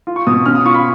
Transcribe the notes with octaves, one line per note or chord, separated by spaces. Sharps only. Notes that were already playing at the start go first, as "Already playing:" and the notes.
F4
C#6
B2 D#6
C#4 F6
D#6
F4 C#6
B5